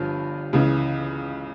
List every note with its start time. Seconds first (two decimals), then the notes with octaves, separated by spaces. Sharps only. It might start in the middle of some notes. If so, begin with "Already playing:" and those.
Already playing: G1 G2 F3
0.53 C#2 C#3 E3